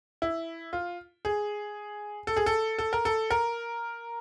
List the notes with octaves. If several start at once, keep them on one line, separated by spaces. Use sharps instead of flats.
E4
F4
G#4
A4
G#4
A4
A4
A#4
A4
A#4